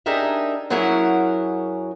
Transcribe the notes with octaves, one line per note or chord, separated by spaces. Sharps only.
D4 D#4 G4 G#4 A#4 E5
F#2 F#3 E4 G#4 A#4 F#5